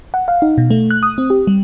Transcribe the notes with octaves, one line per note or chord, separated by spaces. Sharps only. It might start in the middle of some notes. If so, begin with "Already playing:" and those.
F#5
F5
D#4
B2
A3
F#6
D#6
C4
G4
G3